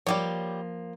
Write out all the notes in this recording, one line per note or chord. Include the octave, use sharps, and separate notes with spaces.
F3 G3 A#3 G4 C#5